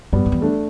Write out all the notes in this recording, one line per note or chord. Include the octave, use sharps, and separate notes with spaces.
G2 G3 B3
G2
E2
A3 D4